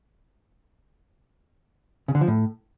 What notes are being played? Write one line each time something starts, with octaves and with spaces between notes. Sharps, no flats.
C#3
D3
F3
A2